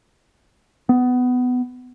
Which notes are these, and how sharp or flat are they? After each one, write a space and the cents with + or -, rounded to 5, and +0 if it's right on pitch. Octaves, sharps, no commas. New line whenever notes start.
B3 +15